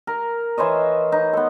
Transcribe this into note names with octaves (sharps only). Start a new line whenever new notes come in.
A#4
E3 C5 C#5 D#5
D#4
B3 A4